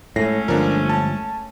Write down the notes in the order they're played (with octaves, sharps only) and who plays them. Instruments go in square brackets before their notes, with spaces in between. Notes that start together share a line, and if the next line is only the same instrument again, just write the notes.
[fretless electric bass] A2 [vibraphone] G#3 [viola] A3 C#4 [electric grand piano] A#6
[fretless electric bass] G1 F3 [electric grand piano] D4 A#4
[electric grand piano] A5